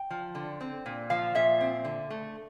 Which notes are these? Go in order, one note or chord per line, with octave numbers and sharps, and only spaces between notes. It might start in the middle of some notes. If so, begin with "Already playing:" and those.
Already playing: G5
F3
D3
C4
A#2
F3 F5
A#2 E5
C4
D3
A3